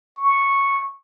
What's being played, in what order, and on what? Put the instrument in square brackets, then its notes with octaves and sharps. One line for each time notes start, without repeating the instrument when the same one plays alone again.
[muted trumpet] C#6